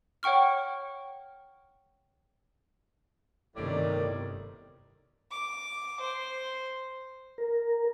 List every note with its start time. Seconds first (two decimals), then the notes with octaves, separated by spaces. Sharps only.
0.23 C#5 F#5 G5 C#6 F6
3.56 G1 A2 C3 D#3 G3 D5
5.31 D6
6.00 C5
7.38 A#4